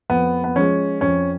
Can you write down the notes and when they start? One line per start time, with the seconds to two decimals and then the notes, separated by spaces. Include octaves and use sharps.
0.10 F2 B3
0.44 B3
0.56 F3 G#3 C#4
1.01 F2 C#4